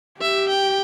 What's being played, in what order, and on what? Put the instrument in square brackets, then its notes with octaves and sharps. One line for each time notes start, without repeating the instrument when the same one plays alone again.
[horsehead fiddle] G4 [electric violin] E5
[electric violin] G5